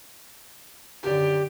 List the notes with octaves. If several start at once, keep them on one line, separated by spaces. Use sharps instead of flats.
F#2 D3 D#3 G4